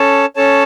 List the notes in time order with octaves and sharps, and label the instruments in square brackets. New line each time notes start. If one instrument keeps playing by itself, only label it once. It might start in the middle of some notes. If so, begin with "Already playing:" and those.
Already playing: [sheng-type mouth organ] C#4 A4 C#5 A5
C#4 A4 C#5 A5